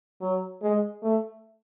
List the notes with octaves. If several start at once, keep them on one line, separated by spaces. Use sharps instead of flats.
F#3
G#3
A3